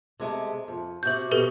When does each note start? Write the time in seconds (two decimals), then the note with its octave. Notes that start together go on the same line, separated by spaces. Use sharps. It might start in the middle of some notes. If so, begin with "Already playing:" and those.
0.20 C3 G#3 A3
0.68 F2
1.03 C3 F#4 G6 F#7
1.31 B2 G4 A4 B4